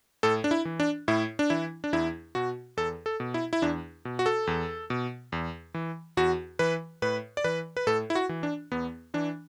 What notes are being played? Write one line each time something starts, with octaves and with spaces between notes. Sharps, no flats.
A2 A4
D4
E4
E3
D4
A2 E4
D4
E3 E4
D4
E2 E4
B2 F#4
E2 A4
A4
B2
E4
E4
E2 D4
B2
F#4
A4
E2
B2
E2
E3
E2 F#4
E3 B4
A2 B4
D5
E3 B4
B4
A2 A4
E4
F#4
E3
D4
E2 B3
E3 D4